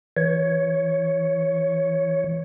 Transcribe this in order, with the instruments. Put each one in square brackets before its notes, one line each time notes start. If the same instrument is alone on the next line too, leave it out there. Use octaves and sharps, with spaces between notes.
[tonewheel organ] E3 C#5